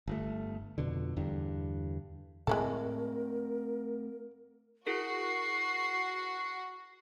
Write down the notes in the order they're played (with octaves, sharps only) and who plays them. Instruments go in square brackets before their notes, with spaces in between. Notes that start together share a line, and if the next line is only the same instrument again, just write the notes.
[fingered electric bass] G1 A3
F2 B2 D3
E2 G2 D3
[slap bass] A2 C4 [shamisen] G#3 E4 A4 [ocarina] A#4
[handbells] E4 G#4 A#4 [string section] F#4 [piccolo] C7